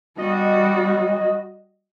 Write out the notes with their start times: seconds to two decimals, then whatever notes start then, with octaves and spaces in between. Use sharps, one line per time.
0.18 G3 F#4 D#5